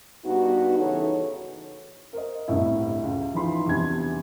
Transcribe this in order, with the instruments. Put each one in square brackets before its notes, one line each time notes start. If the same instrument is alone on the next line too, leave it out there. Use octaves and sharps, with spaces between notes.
[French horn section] G2 B3 D#4 F#4
C#3 E3 D#4 A4 C#5
[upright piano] A#4 C5 D#5
G1 C2 A2 E4
C#2
E3 F3 D#4 B5 C6
E2 C3 G3 D4 G#6